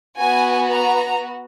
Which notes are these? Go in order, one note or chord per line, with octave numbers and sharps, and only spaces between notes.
B3 F#4 G#5
A#5